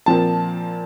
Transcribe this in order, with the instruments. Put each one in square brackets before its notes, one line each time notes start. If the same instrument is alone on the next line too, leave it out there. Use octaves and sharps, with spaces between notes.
[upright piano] A#2 F3 C4 A5